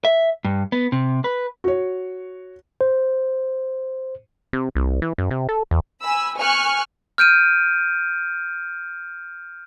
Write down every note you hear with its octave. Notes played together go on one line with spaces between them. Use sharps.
E5
G2
B3
C3
B4
F#4 C#5
C5
C3
C2
E3
F#2
C3
A4
E2
G#5 B5 E6
G#5 C#6 F6 F#6
F6 G6 D7 D#7